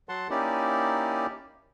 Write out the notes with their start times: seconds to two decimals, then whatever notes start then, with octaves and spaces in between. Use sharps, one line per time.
0.09 F#3 F#5 A5 C6
0.30 A#3 C#4 D#4 E4 G4 D5